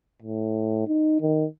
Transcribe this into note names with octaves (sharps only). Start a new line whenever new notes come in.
A2
D#4
D#3